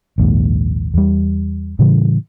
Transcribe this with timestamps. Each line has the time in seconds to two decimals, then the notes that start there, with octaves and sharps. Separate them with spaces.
0.18 A#1 D#2 G#2
0.94 E2 G3
1.79 A2 C#3 E3 G3